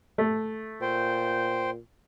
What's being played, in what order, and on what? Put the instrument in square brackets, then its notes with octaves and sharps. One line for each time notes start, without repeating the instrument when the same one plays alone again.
[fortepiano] A3
[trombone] A#2 [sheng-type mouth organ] C5 G5